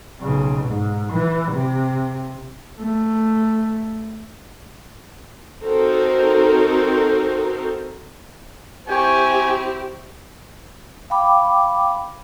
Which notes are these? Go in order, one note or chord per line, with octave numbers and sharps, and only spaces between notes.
B1 C#3
G#2
E3
C3
A3
C4 D#4 F#4 A4 A#4 C5
C4 E4 G4 G5 G#5 C#6
F5 G5 B5 D6